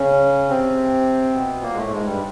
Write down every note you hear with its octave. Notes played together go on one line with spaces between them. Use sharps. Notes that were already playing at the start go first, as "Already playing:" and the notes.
Already playing: C#3 C#4
C3 C4
B2 B3
A#2 A#3
G#3
A2 A3
G#2 G#3
G2 G3